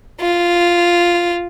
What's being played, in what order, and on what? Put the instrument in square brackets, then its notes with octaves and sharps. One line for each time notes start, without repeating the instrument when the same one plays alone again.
[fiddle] F4